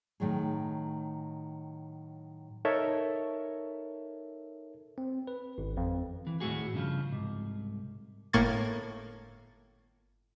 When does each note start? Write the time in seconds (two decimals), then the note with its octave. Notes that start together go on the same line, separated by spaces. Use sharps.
0.20 A2 D#3 F#3 G#4
2.65 D#4 A4 A#4 C#5 E5
4.98 C4
5.27 B4
5.58 G#1
5.77 F2
6.27 E3
6.40 D#2 A2 A3 F#4 G#4
6.73 G2 C#3 F3
7.12 C2 G#2
8.33 G1 A2 A#3 C#6 G#6 A6